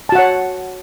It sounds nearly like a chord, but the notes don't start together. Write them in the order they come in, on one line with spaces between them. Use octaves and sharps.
A5 F#4 F#5 C#5